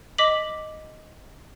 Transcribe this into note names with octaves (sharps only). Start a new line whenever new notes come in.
D#5 D6 B6 F#7